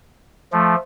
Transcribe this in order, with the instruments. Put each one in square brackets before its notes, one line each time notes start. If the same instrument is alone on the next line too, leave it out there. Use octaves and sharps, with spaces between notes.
[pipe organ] F3 A3